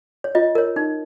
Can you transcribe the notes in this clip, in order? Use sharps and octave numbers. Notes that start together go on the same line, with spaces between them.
C#5
F4 D#5
A#4 C#5
D#4